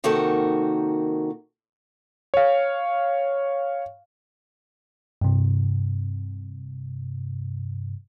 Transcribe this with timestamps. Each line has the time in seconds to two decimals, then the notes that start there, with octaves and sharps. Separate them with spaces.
0.04 C3 D#3 A#3 D#4 F#4 A4
2.34 C#5 F5
5.21 G2 C3